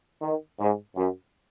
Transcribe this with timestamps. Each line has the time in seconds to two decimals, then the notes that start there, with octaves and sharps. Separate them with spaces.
0.22 D#3
0.60 G#2
0.96 F#2